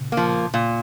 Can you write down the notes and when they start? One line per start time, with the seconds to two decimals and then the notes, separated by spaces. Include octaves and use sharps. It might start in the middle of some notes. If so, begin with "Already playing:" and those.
Already playing: A#2 C#3
0.12 A#3
0.17 F3
0.54 A#2